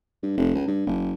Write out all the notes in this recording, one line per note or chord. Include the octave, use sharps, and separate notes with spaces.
G2
F1
C#2
G2
F#1